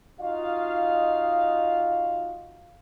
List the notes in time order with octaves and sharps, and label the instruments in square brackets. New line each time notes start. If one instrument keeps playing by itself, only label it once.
[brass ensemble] D#4 F4 F#4 D#5 F5